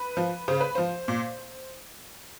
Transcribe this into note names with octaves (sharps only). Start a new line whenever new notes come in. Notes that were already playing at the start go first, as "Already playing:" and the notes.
Already playing: B4
F3
C#3 C5
B4
F3 C5
A#2